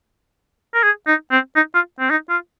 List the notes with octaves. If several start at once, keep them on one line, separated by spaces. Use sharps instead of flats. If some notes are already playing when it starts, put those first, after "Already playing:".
A#4
G#4
D#4
C4
D#4
F4
C4
D#4
F4